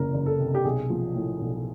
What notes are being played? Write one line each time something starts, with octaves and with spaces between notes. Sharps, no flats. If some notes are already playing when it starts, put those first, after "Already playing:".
Already playing: F#1 E2 C3 A#4
F#1
A4
C3
G4
B1 G#4
F3
A2
B1